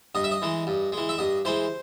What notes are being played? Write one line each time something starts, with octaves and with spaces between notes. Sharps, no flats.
G2 D#5
E5
D#5
E3 G#3
G2
E3 G#3
E5
G2 D#5
E3 G#3 C5